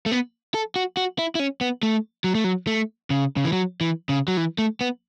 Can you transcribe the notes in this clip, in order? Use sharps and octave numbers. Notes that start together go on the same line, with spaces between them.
A3
B3
A4
F#4
F#4
E4
E4
C#4
B3
A3
F#3
A3
F#3
A3
C#3
C#3
E3
F#3
E3
C#3
F#3
E3
A3
B3